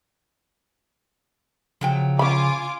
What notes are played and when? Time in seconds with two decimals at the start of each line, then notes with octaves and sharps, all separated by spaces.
1.81 C#3 F3 F#3 G5
2.19 C#4 F4 G#5 B5 D6